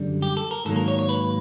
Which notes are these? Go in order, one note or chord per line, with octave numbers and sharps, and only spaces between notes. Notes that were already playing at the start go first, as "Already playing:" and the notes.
Already playing: F#2 D3 G3
G4
A4
A#4
G#2 D#3 F#3 A#3 A4
A#4
C#5
C#5
B4